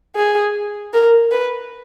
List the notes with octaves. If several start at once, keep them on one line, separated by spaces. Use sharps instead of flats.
G#4
A#4
B4